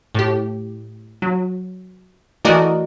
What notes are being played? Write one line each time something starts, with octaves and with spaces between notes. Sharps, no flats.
A2 G4
F#3
E3 A3 F#4 A#4 D5 D#5